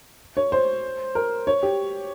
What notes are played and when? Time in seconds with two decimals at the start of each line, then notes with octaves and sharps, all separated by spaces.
0.37 C#5
0.52 C5
1.15 A#4
1.47 C#5
1.63 G4